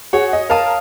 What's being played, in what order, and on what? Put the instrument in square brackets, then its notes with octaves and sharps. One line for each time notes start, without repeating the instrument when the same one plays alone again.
[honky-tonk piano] F#4 G#4 [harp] C#5
[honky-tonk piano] D#5
[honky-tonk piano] A#4 A5 [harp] F5 D#6